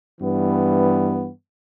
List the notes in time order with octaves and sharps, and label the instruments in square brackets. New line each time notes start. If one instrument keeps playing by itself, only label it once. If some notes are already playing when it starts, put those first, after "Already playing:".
[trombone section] G2 E3 B3